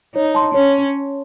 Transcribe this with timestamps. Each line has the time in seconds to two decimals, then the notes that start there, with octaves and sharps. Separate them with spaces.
0.15 D#4 C#5
0.35 A5 C6
0.54 C#4 C#5